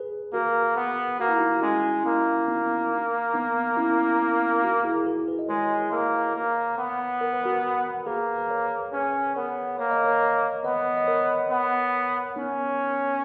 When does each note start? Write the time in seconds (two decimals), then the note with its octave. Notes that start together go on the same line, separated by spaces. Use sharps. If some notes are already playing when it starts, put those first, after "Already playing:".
Already playing: G#4 B4
0.33 A#3 F#4 A#4
0.76 B3
1.20 A#3 F#4
1.29 E4
1.38 D#4 F#4
1.56 F#4
1.62 G#3 C#4 E4
2.05 A#3 C#4 E4
2.48 B3 D#4
3.34 B3 D#4
3.77 C#4 E4
4.64 D#4 F#4
4.84 E4 G#4
4.98 G#4
5.06 F#4 A#4
5.27 G#4 B4
5.39 D#5
5.49 G#3 A#4 C#5
5.92 A#3
6.35 A#3
6.78 B3
7.21 A#4
7.33 B4
7.44 F#4 A#4
8.06 A#3 G#4 B4
8.38 B4
8.50 A#4 C#5
8.92 C#4 G#4 B4
9.36 B3 A#4 C#5
9.79 A#3 C#5
9.91 D#5
10.04 A#4 C#5
10.64 B3 B4 D#5
10.97 D#5
11.07 A#4 C#5
11.50 B3
12.36 B3 C#4 D#4